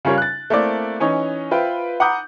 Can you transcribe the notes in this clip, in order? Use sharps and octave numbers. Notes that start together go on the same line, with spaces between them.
C#3 G3 C#4 F4 A#4 C#5
F#6 A6
A3 A#3 C4 E4 D5
E3 C#4 D#4 C#5
F4 B4 C5 E5 G5
F#5 A#5 B5 D6 D#6 G6